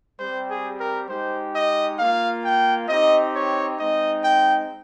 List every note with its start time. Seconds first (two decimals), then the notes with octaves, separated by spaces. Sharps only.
0.19 G3 C4 G4 C5
0.49 G#4
0.80 A#4
1.09 G#3 D#4 G4 C5
1.54 D#5
1.99 A#3 F4 F5
2.44 G5
2.89 C4 D#4 G4 D#5
3.35 C#5
3.80 G#3 C4 D#4 D#5
4.24 G5